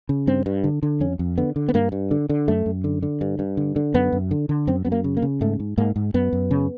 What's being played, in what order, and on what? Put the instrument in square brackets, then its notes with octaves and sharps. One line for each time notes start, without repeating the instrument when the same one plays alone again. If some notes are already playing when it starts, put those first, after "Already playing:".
[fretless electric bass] C#3
G2 C4
G2
D3
D3
F2 C#4
F2
D3 B3
D3
B3
G2 A#3
G2
D3
D3
F#2 A3
F#2
D3
D3
G2
G2
D3
D3
F#2 B3
F#2
D3
D3
F#2 C4
F#2 B3
A#3
C#3
A#3
C#3
G#2 A3
G#2
G#2 A#3
G#2
F#2 B3
F#2
C#3